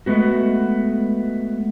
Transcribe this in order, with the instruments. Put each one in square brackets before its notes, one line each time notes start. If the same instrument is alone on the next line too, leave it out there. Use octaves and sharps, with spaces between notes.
[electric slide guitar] G#3 A3 B3 F#4